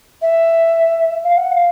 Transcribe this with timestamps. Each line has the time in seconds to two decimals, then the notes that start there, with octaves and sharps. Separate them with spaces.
0.22 E5
1.24 F5
1.37 F#5
1.51 F5